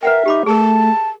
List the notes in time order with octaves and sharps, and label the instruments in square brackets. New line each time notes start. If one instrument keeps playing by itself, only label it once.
[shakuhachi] A#4 [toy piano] B4 F#5 G5 [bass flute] E5
[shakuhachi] D#4 [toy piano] G4 B5 D6
[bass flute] A3 [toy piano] G#4 A#4 [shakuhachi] A5